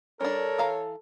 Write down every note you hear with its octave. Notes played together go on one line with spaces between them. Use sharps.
G3 D4 A4 A#4 C#5
E3 F5 A#5